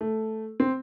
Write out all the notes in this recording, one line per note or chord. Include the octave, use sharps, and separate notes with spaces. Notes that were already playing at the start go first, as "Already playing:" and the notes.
A3
C4